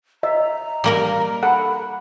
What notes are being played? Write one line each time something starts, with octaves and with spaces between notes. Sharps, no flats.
D#5 E5 A#5
G3 A#3 A#4
A4 F#5 B5